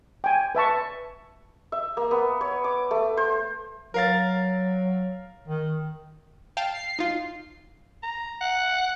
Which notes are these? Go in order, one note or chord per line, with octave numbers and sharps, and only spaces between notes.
G5 G#5
B4 E5 A5 C#6
E5
A#3
B3
C#5
D6
A3
C5
F#3 A#4 F5 A6
D#3
F5 G5 A5
C7
D#4 F4
A#5
F#5